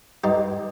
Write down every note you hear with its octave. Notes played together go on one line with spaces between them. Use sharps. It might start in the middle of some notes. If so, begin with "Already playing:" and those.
G2 D#4 G4